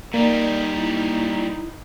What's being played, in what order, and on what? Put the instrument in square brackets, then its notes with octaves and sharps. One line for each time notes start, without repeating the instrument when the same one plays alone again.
[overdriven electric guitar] A#2 G3 [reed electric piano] A#3 [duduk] D#4 [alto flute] D5
[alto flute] E4